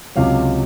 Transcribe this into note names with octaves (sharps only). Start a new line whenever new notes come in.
C#2 C3 F#3 F5